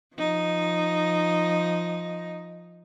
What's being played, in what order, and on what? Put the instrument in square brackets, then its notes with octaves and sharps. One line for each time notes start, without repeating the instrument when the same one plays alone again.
[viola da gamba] F3 D#4